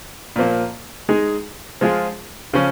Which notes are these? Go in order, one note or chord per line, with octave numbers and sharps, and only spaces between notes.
A#2 F3 A#3
G#3 D#4 G#4
F3 G#3 F4 G#4
C#3 F3 C#4